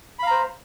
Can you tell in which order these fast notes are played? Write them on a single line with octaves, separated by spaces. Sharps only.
B5 F5 A#5 C5